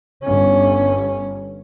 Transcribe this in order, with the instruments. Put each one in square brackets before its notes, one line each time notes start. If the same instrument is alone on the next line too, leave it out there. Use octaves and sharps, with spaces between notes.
[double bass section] G1 [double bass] C#4